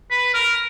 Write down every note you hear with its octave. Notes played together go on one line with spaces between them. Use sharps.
B4
A#4